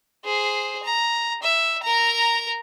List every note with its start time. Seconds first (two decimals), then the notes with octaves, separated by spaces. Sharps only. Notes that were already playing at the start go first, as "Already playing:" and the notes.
0.25 G#4 C5
0.83 A#5
1.43 E5
1.83 A#4 A#5